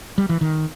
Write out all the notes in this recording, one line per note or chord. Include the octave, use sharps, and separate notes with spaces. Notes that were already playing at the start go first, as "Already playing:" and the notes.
G3
E3
D#3